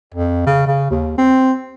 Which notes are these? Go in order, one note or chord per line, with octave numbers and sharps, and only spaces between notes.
F2
C#3
C#3
D#2
C4